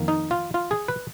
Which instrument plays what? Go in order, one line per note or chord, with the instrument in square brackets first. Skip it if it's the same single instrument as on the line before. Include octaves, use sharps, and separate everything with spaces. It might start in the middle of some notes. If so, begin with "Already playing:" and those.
Already playing: [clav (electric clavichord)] F2 D#3 A#3
D#4
F4
F4
G#4
B4